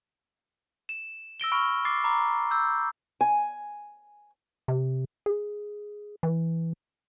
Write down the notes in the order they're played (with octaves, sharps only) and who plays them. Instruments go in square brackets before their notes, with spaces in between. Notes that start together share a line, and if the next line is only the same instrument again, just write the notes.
[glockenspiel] E7
E6 A#6 D7 G7
B5 C#6 F6 D7
D6 A6 C7
A#5 B5 D6
E6 G6
[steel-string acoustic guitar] G#5
[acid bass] C3
G#4
E3